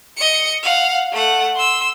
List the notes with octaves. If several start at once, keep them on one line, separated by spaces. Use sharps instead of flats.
D#5 C#7
F5 F#5
A3 F#5
C6 E6